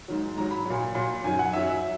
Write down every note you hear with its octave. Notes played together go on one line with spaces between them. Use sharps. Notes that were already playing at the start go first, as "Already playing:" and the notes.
G#2 D#3 F#3
G#2 D#3 F#3 A#5
B5
A#2 F#3
A#2 F#3
F#2 D#3 F#3 G#5
F#5
F#2 D#3 F#3 E5
E5